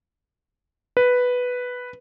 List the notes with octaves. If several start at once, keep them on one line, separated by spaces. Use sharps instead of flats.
B4